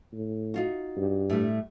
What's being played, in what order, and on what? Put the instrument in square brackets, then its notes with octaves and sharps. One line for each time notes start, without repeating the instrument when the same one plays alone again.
[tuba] A2
[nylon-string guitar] D#4 F4 F#4
[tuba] G2
[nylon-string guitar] A2 G3 A3